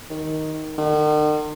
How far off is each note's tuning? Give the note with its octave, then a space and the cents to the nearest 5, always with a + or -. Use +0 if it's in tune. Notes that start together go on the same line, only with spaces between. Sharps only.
D#3 +5
D#3 -45